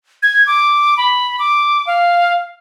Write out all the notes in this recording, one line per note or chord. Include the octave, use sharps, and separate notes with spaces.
G#6
D6
B5
D6
F5